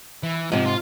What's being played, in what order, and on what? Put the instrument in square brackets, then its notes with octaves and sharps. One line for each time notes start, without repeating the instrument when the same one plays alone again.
[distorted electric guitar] E3
[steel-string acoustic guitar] G#2 C3 [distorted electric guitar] F3
[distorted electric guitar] F4